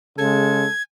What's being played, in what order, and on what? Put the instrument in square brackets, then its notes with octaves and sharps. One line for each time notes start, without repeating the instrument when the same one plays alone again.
[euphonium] C#3 [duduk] G#3 [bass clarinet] A4 [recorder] G#6